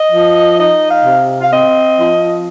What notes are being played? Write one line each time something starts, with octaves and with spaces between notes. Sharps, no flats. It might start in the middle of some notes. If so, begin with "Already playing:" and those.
Already playing: D#5
F3
D#4 D#5
F5
C3
F5
C4 D#5
F3